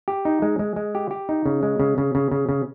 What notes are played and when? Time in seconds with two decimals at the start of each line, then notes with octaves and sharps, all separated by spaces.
0.08 G4
0.25 D#4
0.42 G#3
0.59 G#3
0.76 G#3
0.95 G4
1.11 G4
1.29 D#4
1.46 C#3
1.63 G#3
1.80 C#3
1.98 C#3
2.15 C#3
2.32 C#3
2.49 C#3